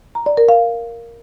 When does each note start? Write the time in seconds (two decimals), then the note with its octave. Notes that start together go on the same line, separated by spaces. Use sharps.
0.15 A#5
0.26 D5
0.37 A#4
0.49 F5